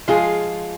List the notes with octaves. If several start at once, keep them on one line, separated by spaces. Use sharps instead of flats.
F3 G#3 F4 G#4